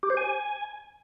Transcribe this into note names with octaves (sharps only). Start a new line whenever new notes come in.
G4
C5
G#5